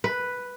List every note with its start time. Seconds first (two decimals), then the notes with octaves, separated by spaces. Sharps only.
0.04 B4